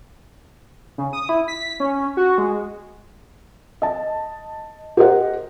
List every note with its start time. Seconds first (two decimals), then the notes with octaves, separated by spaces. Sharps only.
0.98 C#3
1.13 D#6
1.29 E4
1.48 B6
1.80 C#4
2.17 F#4
2.38 G#3
3.82 D#5 A5
4.97 G4 A#4 C5 D#5 F#5